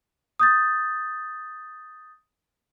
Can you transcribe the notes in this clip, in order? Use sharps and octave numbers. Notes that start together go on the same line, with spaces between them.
D#6 G6 A6